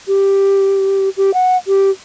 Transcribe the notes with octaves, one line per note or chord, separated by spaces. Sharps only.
G4
G4
F#5
G4